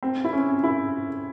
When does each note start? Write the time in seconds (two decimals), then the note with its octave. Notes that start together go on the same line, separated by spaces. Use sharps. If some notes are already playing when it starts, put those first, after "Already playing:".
0.03 C4
0.24 E4
0.33 C#4
0.63 E4